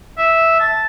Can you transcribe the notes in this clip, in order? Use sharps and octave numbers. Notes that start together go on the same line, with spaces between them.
E5
A5